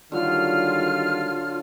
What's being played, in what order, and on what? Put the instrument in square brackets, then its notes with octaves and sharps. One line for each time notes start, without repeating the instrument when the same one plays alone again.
[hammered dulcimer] D3 F#3 [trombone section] D#3 G3 [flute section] F4 F6